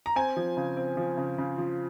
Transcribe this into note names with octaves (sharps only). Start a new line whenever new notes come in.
A#5
C4 G#5
F3
C#3
C4
F3
C#3
C#3
F3